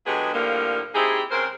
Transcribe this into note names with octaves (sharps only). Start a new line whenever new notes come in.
D3 F#3 G#3 B3 G4 G#4
A2 D3 F3 G3 A#3
C4 D#4 E4 G4 G#4
C#3 G#3 C4 A#4 C5